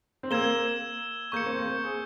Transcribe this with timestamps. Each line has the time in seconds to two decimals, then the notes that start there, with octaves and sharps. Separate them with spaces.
0.23 C4
0.31 A#3 E6 G#6 E7 G7
1.32 A#3 C#6 G6 C#7
1.46 C4
1.59 A#3
1.83 G#4